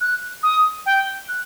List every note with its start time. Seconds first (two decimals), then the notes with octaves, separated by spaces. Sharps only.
0.01 F#6
0.43 D#6
0.86 G5
1.29 F#6